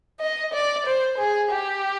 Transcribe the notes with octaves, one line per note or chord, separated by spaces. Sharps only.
D#5
D5
C5
G#4
G4